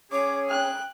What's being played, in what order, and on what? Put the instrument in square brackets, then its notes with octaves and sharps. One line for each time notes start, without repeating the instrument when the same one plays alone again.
[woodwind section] C#4 G#4 [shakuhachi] C#5 [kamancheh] D6
[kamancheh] G5 F#6